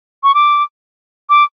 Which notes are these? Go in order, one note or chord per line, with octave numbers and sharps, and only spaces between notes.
C#6
D6
D6